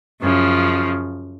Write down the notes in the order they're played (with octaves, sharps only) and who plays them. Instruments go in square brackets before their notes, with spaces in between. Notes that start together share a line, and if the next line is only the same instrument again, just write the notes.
[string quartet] F#2 C#3 F3